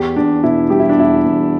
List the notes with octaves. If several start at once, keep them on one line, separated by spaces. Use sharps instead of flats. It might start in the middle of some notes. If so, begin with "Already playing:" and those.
Already playing: E2 G4
E2 D4
B2 E4
G3 G4
E4
D4
E2 E4
E2